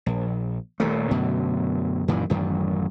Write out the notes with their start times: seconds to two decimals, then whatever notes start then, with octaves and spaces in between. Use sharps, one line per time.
0.06 A#1
0.80 D#1 D#2 A#2 A3
1.11 F#2 B2 D3 A3
2.08 F#2 A#2 D#3 E3
2.30 A1 F#2 D#3